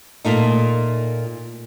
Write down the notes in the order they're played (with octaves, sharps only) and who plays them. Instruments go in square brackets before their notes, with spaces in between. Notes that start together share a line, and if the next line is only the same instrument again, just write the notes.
[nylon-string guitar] A#2 A3 D#4